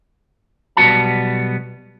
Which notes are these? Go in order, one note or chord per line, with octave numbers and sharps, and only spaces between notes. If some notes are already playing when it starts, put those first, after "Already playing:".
B1 G3 B3 F#4 A5